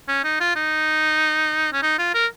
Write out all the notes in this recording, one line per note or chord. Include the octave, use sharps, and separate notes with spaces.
C#4
D#4
F4
D#4
C#4
D#4
F4
A#4